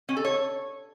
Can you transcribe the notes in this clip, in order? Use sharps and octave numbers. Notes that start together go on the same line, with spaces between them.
C#4
A4
C#5